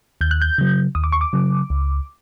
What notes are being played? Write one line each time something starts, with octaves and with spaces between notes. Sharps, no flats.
D#2 G6
F#6
G6
C#3 F#3
D#2 D#6
D6
C#6
D6
C#3 F#3
C#2